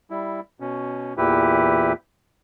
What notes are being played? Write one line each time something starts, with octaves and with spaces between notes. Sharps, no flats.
G3 E4
B2 C#4
E2 A#2 E3 E4 G4 B4